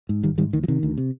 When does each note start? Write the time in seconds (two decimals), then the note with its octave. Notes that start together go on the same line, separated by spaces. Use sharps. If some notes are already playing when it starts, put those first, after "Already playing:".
0.09 G#2
0.23 G#1 D#3 G3
0.38 G#2 D#3 G3
0.53 D2 D#3
0.63 F3
0.68 C3 D#3
0.83 D2
0.98 C3